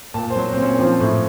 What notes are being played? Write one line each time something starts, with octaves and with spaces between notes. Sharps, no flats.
A#2 A5
C5
F#3
A#2 C4
C#4
F3 C4
A2